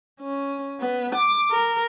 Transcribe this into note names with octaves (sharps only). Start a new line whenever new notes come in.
C#4
B3
D6
A#4